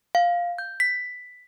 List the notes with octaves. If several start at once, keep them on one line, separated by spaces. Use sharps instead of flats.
F5
G6
B6